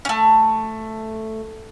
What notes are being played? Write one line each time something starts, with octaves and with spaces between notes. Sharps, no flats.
A3 C#4